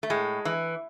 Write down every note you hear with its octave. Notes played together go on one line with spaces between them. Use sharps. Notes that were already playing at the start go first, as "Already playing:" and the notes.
A3
A2 G#3
E3